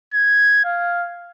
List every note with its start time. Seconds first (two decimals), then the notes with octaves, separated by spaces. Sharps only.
0.14 G#6
0.65 F5